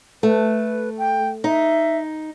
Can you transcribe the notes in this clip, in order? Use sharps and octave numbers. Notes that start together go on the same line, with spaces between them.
A3 B4
G5
D#4 E5